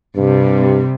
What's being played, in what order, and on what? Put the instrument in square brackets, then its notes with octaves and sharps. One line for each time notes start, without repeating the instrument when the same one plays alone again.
[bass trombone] G2 [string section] C3 G3